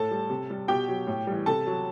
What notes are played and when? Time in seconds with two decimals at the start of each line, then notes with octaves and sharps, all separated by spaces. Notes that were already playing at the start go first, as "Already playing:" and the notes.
Already playing: A2 A4 A5
0.11 G3
0.30 C3
0.50 G3
0.68 B2 G4 G5
0.88 F#3
1.07 A2
1.27 E3 G3
1.46 C3 A4 A5
1.67 F#3